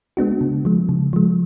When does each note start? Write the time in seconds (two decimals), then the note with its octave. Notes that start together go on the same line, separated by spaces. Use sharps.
0.17 G#3 B3 D4 F#4
0.41 C#3
0.65 F3 G#3
0.89 C#3
1.13 F3 G#3